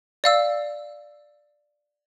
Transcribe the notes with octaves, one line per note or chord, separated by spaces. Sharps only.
D5 F5 E6